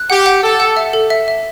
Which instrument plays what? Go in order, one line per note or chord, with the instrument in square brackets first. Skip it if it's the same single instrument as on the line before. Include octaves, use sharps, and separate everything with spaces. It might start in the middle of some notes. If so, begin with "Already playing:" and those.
Already playing: [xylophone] F#6
[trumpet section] G4 [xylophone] F#5
[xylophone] F#5
[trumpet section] A4 [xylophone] E6
[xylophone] F#5
E5
A4
E5
E5